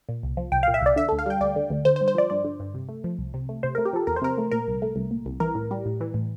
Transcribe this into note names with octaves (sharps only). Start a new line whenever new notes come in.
A#2
C2
F3
C2 G5
F5
A#2
E5
C2 D5
D3 E5
A4
D2
F5
G3 G5
D2 D5
D3
D2
D3 C5
C5
G2
C5
F3 D5
G2 D5
D3
G2
C3
A3
F3
C2
C3
A3
C3 C5
A#4
A3
G4
F3 A4
E2 A#4
C5
C3 A#4
A3
A#2 A#4
C2
A3
C2
A#2
C2
E3 A#4
A2
G3
A2
E3
A2